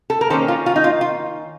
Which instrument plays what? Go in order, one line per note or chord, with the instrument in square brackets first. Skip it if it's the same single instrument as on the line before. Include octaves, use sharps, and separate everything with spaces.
[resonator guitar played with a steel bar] A4
A#4
D#3 A#3 C#4 A4 C5
F4
F4
D#4
F4
F4